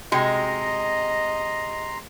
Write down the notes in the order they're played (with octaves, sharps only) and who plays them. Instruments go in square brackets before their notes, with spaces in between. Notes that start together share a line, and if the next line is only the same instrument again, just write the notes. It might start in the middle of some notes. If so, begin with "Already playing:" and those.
[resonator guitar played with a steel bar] C3 G#3 [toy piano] F#4 G5 [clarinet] D#5 [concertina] A#5 C6